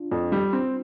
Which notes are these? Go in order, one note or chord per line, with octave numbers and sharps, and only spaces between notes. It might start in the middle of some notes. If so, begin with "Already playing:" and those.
Already playing: D4 F4
F2
G3
C4